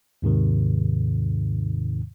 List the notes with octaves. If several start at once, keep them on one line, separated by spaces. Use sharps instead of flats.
D#2 G#2 C3 D#3